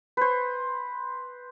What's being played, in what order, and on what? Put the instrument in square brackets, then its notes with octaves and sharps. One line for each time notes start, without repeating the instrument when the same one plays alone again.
[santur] B4 C5